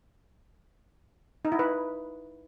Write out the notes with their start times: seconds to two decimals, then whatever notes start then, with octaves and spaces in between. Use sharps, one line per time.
1.45 D#4
1.52 E4
1.59 B4